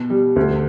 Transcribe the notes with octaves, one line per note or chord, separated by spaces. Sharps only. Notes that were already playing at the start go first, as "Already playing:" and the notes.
Already playing: B2
G3
D2